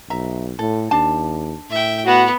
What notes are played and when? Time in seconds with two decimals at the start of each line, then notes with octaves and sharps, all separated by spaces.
0.10 B1 E5 A#5
0.59 A2 A4
0.91 D#2 D4 A5
1.70 A2 E5 G5
2.06 B3 F#4